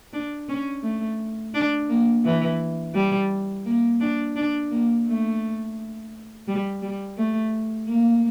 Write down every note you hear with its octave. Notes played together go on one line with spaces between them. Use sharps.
D4
C#4
A3
D4
A#3
E3
G3
A#3
D4
D4
A#3
A3
G3
G3
A3
A#3